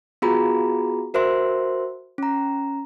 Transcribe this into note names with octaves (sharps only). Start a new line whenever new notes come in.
B3 F4 F#4 G#4 A#5 B5
F#4 A#4 C5 E5 C6
C#4 A#5